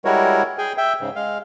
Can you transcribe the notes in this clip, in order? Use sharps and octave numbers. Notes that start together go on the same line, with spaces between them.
G3 G#3 E4 F#4 A#4 C#5
G#4 G5 G#5
E5 G5
G#2 C#3
G#3 F5